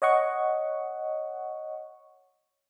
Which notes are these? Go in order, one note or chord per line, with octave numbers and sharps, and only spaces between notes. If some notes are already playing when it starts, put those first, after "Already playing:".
C#5 D#5 F#5 C#6